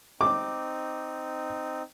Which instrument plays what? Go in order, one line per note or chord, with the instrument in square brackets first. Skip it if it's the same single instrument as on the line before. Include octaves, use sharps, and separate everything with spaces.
[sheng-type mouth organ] C4 D#4 [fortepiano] D6